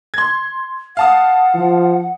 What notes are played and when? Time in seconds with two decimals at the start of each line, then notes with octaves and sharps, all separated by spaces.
0.14 C6 G#6
0.97 F5 F#5 A5 D#6
1.55 F3